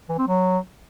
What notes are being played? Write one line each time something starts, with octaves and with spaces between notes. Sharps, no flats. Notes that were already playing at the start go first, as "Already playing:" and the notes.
E3
C4
F#3